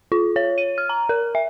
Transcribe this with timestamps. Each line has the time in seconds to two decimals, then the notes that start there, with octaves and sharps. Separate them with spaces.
0.12 F4
0.36 C#5
0.58 D#7
0.78 F6
0.89 A#5
1.09 A#4
1.35 E5